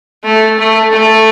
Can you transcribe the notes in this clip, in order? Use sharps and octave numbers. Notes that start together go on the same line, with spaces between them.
A3
A3
A3